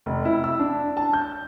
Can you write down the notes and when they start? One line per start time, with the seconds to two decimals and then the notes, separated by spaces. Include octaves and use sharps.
0.06 F1
0.25 E4
0.44 E6
0.59 D4
0.97 A5
1.13 G6